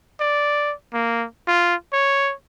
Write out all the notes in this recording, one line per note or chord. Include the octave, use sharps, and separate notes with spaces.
D5
A#3
F4
C#5